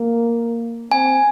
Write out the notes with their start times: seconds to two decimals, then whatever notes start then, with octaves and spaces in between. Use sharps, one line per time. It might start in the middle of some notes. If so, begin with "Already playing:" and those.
Already playing: A#3
0.91 C4 G#5